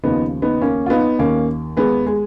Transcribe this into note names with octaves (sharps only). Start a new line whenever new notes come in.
D#2 C#3 F3 B3 D#4
B3 D#4
A#3 C#4
F4
B3 D#4
D#2 D#3 A#3 C#4
G#3 B3
G#3